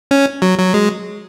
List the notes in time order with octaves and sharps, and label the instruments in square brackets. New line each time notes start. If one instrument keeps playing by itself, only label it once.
[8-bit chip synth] C#4
F#3
F#3
G#3